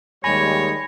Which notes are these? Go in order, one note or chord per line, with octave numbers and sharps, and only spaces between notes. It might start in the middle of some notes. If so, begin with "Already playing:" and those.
D#2 G3 G#3 C#5 G#5 B5 A#6